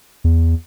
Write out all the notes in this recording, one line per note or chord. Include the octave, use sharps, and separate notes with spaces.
E2